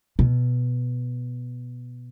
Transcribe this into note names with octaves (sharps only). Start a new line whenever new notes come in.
B2